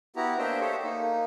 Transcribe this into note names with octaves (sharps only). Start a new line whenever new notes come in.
B3 E4 F#4 G4 A#5
A#3 D4 C5 D#5 E5 G5
G4 A4 C5 C#5
A#3 D#4